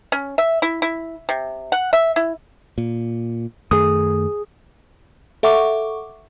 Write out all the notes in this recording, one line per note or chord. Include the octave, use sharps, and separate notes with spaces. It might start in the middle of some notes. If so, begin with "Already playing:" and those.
C#4
E5
E4
E4
C3
F#5
E5
E4
A#2
F#2 D#3 A3 G#4 D#6
A4 E5 F#5 C#6 D6